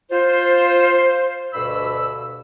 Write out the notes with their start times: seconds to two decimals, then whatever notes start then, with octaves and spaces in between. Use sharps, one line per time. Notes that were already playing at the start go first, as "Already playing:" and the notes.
0.10 F4 C5
1.53 D2 G2 B2 B5 E6